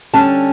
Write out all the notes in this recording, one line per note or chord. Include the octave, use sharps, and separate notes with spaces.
D3 G3 C#4 A5